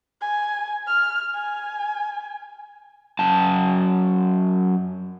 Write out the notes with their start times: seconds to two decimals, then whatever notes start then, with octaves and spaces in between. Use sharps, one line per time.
0.21 G#5
0.87 F6
1.34 G#5
3.19 F#2 A5